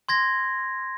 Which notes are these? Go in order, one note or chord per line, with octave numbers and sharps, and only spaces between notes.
C6 G#6 A#6